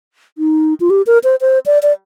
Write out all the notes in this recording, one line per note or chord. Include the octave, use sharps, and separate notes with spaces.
D#4
F4
G4
A#4
C5
C5
D5
D5